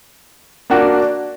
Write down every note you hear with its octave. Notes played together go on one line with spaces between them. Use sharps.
A#3 D4 F#4